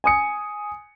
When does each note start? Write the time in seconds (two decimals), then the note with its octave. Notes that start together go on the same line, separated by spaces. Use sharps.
0.04 G#5 D#6 C#7